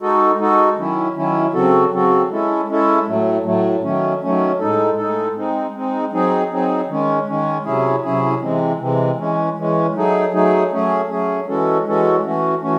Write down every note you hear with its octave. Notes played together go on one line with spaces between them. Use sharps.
G#3 D#4 F#4 A4
G#3 D#4 F#4 A4
D#3 F#3 C#4 E4
D#3 F#3 C#4 E4
C#3 F#3 C4 F#4 A4
C#3 F#3 C4 F#4 A4
G#3 C#4 E4 A4
G#3 C#4 E4 A4
A2 F#3 A3
A2 F#3 A3
D#3 F#3 A3 C#4
D#3 F#3 A3 C#4
A2 G#3 D#4 A4
A2 G#3 D#4 A4
G#3 C4 D#4
G#3 C4 D#4
F#3 C4 D#4 G#4
F#3 C4 D#4 G#4
D#3 G#3 C#4
D#3 G#3 C#4
C3 F#3 C#4 E4 G#4
C3 F#3 C#4 E4 G#4
C3 E3 G#3 C4
C3 E3 G#3 C4
E3 G#3 C#4
E3 G#3 C#4
F#3 A3 D#4 G#4
F#3 A3 D#4 G#4
F#3 A3 C#4 G#4
F#3 A3 C#4 G#4
E3 G#3 C#4 F#4 A4
E3 G#3 C#4 F#4 A4
E3 A3 C#4 F#4
E3 A3 C#4 F#4